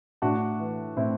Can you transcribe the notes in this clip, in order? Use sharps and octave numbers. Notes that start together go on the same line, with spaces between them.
A2 D4 F#4
E3
A2 C4 E4